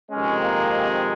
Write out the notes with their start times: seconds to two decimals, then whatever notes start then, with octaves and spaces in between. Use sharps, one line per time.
0.11 F2 C3 D#3 G#3 C#4
0.43 A#3